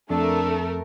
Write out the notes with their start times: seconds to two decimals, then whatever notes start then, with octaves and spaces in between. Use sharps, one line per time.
0.10 F2 A3 D4 A4 A#4